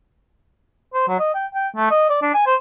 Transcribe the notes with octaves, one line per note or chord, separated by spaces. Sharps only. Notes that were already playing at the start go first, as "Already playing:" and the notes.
C5
F#3
D#5
G5
G5
A3
D#5
D5
D4
G#5
C5